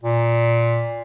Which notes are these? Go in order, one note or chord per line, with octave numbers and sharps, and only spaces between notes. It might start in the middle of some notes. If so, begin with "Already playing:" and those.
A#2